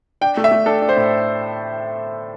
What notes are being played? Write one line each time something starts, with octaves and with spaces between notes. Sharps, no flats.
D4 G5
A3
E5
A3
D4 A4
D4
C5
A2